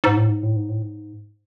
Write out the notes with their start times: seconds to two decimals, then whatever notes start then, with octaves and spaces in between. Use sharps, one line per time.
0.04 G#2
0.17 A2
0.29 G#2
0.43 A2
0.56 G#2
0.69 A2
0.82 G#2